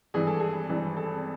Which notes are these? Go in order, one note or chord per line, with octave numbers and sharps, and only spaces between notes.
G#1 G2 E3 G#4
A4
G#4
G#1 G2 E3
A4